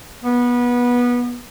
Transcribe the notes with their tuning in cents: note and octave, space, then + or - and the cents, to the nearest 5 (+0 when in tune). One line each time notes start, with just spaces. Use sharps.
B3 -20